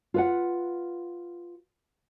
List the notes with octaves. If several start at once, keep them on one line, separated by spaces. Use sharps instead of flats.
F4 B4 F#5